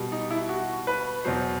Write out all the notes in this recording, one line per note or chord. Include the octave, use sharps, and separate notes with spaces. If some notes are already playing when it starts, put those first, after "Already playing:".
Already playing: B2 G3
D#4
E4
F#4
B4
E2 B2 F#3 C5